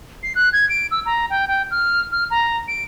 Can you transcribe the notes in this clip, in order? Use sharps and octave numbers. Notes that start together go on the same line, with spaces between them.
C7
F#6
G#6
D7
E6
A#5
G5
G5
F6
F6
A#5
D7